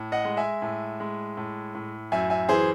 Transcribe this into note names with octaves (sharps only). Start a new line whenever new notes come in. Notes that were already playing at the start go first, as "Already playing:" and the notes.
Already playing: A2
D#5 F#5
G#3
E5 G#5
A2
G#3
A2
A2
F#2 E5 G#5
E5 G#5
E3 G#4 C5